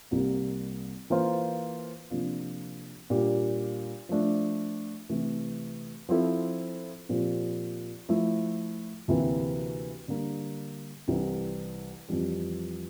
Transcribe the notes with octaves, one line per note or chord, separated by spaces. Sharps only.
C2 C3 G3 A#3
E3 A#3 F4 C5
C3 F3 A#3 D4 F4
A#2 G3 D4 G4
F3 A3 D4
C3 E3 A3
F3 C4 E4 A4
A#2 F3 C4 G4
F3 A3 E4
D2 C3 E3 A#3 E4
D3 G3 A#3
C2 C3 E3
F2 E3 G3